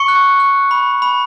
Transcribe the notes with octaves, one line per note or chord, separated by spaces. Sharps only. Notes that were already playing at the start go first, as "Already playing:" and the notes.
Already playing: C#6 C#7
F#6
F#6
B5
B5